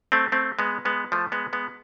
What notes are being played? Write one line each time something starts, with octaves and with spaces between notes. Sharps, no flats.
A3 C4
A3 C4
G#3 B3
G#3 B3
F3 A3
G#3 B3
G#3 B3